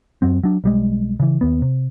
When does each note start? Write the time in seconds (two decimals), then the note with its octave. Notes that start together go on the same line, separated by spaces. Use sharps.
0.22 F#2 F#3 C4
0.44 F#3 D4
0.64 B1 G3 G#3
1.20 C#3 E3
1.41 D#2 B3
1.62 C3